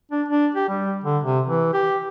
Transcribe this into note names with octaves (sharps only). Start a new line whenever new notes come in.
D4
D4
G4
G3
D3
C3
E3
G4